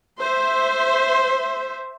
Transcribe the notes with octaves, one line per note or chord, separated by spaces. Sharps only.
C5 E5